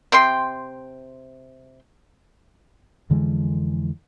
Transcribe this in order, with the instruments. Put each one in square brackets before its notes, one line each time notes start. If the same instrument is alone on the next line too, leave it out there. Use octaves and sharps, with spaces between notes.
[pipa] C3 G5 C6
[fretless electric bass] F2 D3 E3 G#3